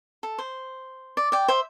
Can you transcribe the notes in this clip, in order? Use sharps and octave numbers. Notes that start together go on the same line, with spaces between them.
A4
C5
D5
D5 G5
C5 E5